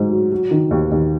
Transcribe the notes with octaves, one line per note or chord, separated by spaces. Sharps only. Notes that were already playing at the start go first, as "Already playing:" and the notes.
Already playing: G#2 F#3
F#3
F#3
D#3
D#2
D#2